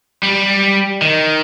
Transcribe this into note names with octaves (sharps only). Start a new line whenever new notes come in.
G3
D#3